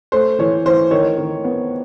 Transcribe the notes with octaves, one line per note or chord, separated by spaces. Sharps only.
A3 C5
E3 C#5
E3 C5
D#3 C#5
D#3
B3